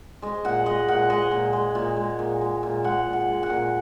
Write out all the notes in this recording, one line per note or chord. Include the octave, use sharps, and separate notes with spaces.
G#3 D#5
A#2 F#5
G#3 D#5
A#2 F#5
G#3 D#5
A#2
G#3
A#2
G#3
A#2
G#3
A#2
G#3 F#5
A#2
F#5
G#3
F#5
A#2